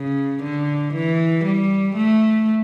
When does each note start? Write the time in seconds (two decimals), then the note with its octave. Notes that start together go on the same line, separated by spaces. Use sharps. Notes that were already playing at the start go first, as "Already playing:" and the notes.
Already playing: C#3
0.43 D3
0.94 E3
1.45 G3
1.96 A3